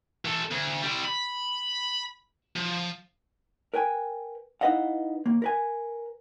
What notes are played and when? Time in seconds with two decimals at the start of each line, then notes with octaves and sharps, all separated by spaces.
0.25 E3 A4
0.51 D2
0.82 G3 E4
1.05 B5
2.56 F3
3.74 A#4 B4 G5 G#5
4.61 D#4 E4 B4 D#5 F5 F#5
5.26 D#2 A#3
5.42 A#4 B4 G#5